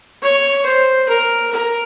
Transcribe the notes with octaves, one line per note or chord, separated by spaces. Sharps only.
C#5
C5
A#4
A#4